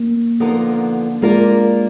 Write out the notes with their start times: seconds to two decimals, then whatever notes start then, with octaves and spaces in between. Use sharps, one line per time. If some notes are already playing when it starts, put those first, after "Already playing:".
Already playing: A#3
0.40 D3 F3 B3 D#4 A#4
1.22 G#3 A#3 D4 F4 A#4